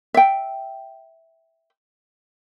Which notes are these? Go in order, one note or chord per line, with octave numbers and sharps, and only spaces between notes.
E5 G5